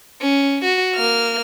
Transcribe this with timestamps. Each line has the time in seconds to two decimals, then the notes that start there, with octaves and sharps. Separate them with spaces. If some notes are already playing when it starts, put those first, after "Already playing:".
0.21 C#4
0.64 F#4
0.95 A#3 F6